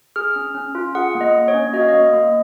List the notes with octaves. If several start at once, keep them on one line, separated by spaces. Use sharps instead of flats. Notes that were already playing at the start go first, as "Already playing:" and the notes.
G#4 F6
C#4
C#4
F4
G#4 F#5
A#3
D#5
A#3
C#5
C#4
F#4 D#5
F5
A#3 D#5
A#3